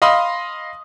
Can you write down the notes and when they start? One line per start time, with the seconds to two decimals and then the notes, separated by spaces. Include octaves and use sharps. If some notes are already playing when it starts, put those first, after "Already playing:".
0.02 D#5 F5 B5 C6 D#6